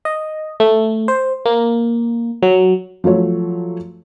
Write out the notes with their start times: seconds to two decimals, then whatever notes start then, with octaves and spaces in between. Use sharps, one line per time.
0.05 D#5
0.60 A3
1.08 C5
1.45 A#3
2.42 F#3
3.04 F3 F#3 A3 C#5